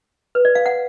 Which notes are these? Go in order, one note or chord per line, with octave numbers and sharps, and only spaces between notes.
B4
D5
F5
F#5